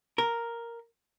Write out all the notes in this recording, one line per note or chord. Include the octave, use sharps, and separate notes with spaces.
A#4